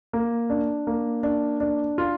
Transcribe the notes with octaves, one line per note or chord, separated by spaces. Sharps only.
A#3
D4
A#3
D4
D4
F4